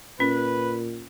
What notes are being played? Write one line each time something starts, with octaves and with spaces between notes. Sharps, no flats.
A#2 C#4 B4